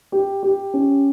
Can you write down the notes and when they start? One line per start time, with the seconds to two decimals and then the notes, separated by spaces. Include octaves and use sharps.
0.12 G4
0.43 G4
0.74 C#4